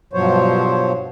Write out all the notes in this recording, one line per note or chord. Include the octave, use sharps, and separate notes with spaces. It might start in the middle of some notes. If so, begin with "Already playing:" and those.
G2 B2 F3 F#3 C5 C#5